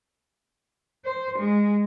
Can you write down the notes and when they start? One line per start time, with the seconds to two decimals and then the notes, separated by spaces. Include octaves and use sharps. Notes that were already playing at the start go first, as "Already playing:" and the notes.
1.05 C5
1.39 G#3